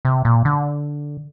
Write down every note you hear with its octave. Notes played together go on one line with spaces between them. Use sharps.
C3
A#2
D3